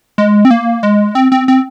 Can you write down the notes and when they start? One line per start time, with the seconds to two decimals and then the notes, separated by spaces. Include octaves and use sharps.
0.18 G#3
0.45 C4
0.51 A#3
0.83 G#3
1.15 C4
1.32 C4
1.48 C4